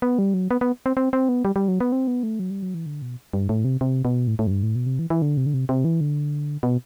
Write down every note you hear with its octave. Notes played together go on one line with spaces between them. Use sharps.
B3
G3
F#3
B3
B3
C4
C4
C4
B3
G3
G3
F#3
B3
C4
B3
A3
F#3
G3
F#3
E3
D3
B2
G2
A2
C3
C3
B2
A2
A2
F#2
G2
A2
B2
C3
E3
E3
D3
C3
D3
C3
C3
E3
D3
B2